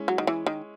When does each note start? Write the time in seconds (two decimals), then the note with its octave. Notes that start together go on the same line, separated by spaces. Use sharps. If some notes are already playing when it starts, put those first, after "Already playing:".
Already playing: G#3 C#4 E4
0.08 F#3
0.18 D#3
0.27 E3
0.46 D#3